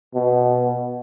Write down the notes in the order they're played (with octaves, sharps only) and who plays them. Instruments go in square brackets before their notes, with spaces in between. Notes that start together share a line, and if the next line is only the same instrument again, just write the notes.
[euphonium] B2